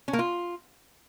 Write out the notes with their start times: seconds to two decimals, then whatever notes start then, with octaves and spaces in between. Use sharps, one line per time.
0.08 C#4
0.13 A#3
0.19 F4